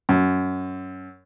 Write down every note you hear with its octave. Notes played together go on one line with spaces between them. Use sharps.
F#2